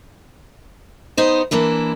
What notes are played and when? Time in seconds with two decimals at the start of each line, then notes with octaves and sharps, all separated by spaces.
1.17 B3 D#4 C5
1.51 E3 A#3 D4 E4